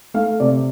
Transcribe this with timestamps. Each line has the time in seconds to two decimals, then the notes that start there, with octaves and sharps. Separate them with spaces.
0.14 A3 F5
0.40 C3 D5